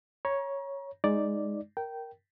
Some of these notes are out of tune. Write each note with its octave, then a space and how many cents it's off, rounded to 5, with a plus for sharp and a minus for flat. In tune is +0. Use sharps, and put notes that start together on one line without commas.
C#5 +0 A#5 +35
G#3 +0 D#4 +0 D5 +0
A#4 +0 G5 -15